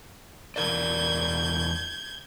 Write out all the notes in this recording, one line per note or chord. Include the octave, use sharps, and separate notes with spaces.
E2 A#4 D5 G6 G#6